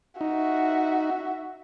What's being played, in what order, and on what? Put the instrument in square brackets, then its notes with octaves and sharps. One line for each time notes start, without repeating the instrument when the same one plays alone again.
[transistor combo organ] D#4 [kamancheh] F#4 E5